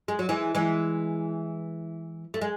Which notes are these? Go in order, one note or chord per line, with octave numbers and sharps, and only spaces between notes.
G#3
F#3
E3 G#3
E3 G#3
A3
G#3